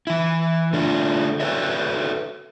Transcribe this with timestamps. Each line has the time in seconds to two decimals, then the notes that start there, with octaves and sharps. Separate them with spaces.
0.07 E3 E4
0.73 D3 A3 D4 F4
1.40 F#4 A4 B4 C#5 D5 E5